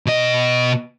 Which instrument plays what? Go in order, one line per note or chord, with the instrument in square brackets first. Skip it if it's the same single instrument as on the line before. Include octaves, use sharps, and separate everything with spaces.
[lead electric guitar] B2 D#5